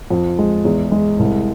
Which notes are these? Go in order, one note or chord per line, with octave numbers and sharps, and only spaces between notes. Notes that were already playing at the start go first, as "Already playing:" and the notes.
F2
G#3
E2
G#3
C2